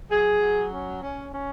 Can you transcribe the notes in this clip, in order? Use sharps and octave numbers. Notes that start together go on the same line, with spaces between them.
F#3 G#4
F#3
C#4
C#4
C#4